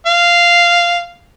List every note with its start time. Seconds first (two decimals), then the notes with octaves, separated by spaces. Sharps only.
0.06 F5